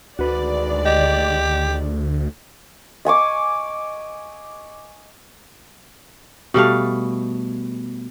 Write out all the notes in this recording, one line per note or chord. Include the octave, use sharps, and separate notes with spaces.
D2 D#3 G#3 F#4 B4 D5
G4 D#5
D#5 G#5 C#6 D6
B2 G3 A3 F5